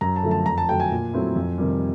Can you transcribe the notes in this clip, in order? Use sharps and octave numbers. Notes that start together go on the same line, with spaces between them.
F#2 A#5
A5
D3 F3 A3
A5
F2 A#5
A5
D3 F#3 A3 G5
G#5
A#2
F#3 A3 C4 E4
F2
C3 D#3 G3